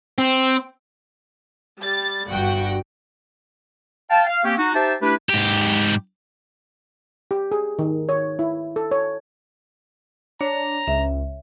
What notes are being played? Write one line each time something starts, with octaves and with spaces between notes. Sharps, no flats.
C4
G3 A6
G1 G2 F#4 F#5 G5
F5 G5 A5
F5
A#3 C4 C#4 G4
D#4 F#4
D#4 G4 C5 E5 G5 A5
A3 D4 E4 G4 B4
G#2 G4
G4
G#4
D#3
C#5
E4
A4
C#5
D4 C#5 A#5
C#2 E5